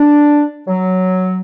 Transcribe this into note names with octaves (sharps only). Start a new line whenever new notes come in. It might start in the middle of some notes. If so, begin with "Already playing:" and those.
Already playing: D4
F#3